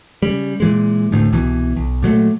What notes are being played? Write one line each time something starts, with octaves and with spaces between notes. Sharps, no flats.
C#3 G3
A#2 E3 G#3
D1 D2 A2
C2 B2 E3
B1
A#2 F#3 G#3 A3